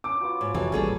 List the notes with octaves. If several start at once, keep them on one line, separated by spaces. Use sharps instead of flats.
C#4 D6
F#3 B3 F4
G#2 C#5
F2 C3 E3 F#3 A5
D#1 A1 G3 G#4 A4